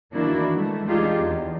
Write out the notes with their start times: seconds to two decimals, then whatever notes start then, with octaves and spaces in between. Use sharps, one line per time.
0.15 D#3 E3 A#3 D4 E4 F#4
0.55 E3 G#3 A3
0.88 D4 D#4 F4 G4 G#4
1.18 E2